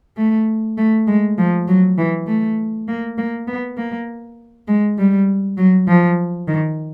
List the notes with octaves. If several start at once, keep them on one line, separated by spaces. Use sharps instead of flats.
A3
A3
G#3
F3
F#3
E3
A3
A#3
A#3
B3
A#3
G#3
G3
F#3
F3
D#3